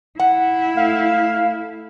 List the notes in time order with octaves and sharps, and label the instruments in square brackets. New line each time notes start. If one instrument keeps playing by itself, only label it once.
[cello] E4 [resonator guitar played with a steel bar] F#5
[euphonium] A3 [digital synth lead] F5